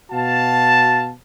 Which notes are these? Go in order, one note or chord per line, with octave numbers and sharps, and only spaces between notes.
B2 F#4 F5 A5